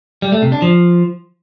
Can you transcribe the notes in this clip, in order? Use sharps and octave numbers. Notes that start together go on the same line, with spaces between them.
G3
A3
C3
D4
F3